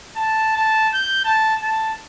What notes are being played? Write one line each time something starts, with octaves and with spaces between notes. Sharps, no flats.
A5
A5
G6
A5
A5